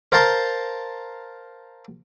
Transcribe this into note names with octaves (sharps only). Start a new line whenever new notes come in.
A#4 C5 F5 A5 A#5 C6